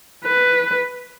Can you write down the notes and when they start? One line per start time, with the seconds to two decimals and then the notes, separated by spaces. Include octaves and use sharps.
0.24 B4